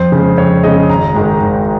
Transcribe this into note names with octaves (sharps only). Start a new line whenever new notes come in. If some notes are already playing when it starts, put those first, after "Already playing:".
Already playing: F2 C5
C#3 G#3
F2 C#5
C#3 G#3 D#5
G#1 A#5
G#2 D#3 G#3
G#1